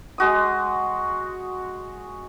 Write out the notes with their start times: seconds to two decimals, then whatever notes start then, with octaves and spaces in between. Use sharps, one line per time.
0.18 G#3 F#4 D#6